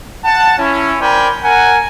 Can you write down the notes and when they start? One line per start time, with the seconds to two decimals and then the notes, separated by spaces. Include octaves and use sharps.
0.25 F#5 A5
0.59 C#4 E4
1.01 A#4 C5 D5 G5 G#5 B5
1.44 A#4 F#5 G#5